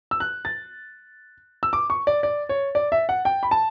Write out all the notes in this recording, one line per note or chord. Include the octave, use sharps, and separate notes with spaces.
E6
F#6
A6
E6
D6
C#6
D5
D5
C#5
D5
E5
F#5
G5
B5
A5